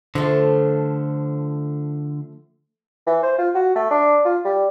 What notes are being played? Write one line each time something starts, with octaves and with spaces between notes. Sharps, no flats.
D3 F3 A3
E3
C5
F4
F#4
A3
D4
F4
G3